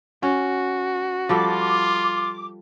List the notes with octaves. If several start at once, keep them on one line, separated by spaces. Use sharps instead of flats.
C#4 F#4
F3 G3 F4 A4 D6